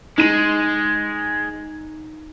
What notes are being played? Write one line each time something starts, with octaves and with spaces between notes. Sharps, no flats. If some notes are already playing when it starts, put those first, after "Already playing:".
G#3 D#4 D#7